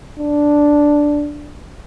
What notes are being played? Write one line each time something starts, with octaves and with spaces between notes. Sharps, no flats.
D4